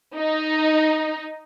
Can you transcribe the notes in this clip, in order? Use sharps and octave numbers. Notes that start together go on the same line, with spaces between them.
D#4